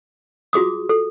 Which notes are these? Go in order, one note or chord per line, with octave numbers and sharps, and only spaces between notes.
F4 F#4 G#4 D6 D#6
A4